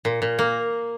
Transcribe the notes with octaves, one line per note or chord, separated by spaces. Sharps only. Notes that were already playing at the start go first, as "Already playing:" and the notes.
A#2
A#2
A#3